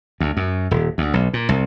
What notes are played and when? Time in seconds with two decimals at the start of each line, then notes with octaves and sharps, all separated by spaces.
0.20 D2
0.37 F#2
0.71 D#1
0.98 D2
1.14 B1
1.33 A#2
1.49 C2